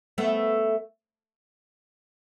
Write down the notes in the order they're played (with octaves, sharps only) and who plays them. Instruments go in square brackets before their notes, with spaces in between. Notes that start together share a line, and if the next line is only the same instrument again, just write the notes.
[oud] A3 B3